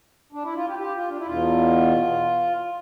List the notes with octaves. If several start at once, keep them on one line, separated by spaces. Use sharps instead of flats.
D4
E4
F4
G4
G4
F4
D4
E4
E2 B2 F4